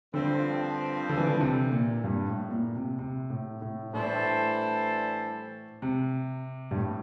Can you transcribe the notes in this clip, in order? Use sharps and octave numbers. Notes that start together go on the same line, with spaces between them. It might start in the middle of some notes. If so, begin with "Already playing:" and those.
G2 D3 F3 C4
D3
E3
D3
C3
A#2
G2
A2
A#2
C3
C3
A2
A2
A2 E3 G3 D4 A4 C5
C3
G2
A2